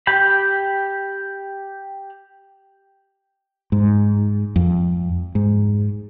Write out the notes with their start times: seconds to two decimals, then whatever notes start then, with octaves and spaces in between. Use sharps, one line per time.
0.07 G4 G5 B5
3.72 G#2
4.56 F2
5.35 G#2